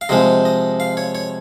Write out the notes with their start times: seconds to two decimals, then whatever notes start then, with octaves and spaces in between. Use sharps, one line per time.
0.01 F5
0.09 C3 F3 G#3 D#5
0.45 D#5
0.80 F5
0.97 C#5
1.15 C#5